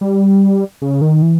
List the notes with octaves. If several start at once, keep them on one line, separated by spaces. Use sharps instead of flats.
G3
C#3
D#3
E3